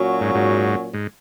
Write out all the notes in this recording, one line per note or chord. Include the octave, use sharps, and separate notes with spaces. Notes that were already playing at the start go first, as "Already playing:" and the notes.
Already playing: A#2 F#3 C#4 F#4
G#2
G#2
G#2